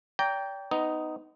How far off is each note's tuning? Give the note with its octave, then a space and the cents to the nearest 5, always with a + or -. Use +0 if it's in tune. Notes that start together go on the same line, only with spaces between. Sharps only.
D5 -40 G5 +0 A#5 +0
B3 +25 D#4 +0